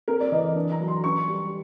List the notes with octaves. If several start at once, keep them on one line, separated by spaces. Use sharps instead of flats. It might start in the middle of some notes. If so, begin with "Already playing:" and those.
C4 A#4
D5
E3 D#5
D4
A#5
F#3
C6
C#4 C#6
G3